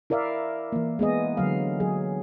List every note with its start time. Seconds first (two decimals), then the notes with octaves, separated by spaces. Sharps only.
0.10 E4 A#4 D5 E5 F5
0.72 E3 A#3
0.99 G#3 B3 G#4 D#5
1.37 D3 F#3 F5
1.80 F#3 G#4